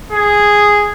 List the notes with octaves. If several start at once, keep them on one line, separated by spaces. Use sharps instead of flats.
G#4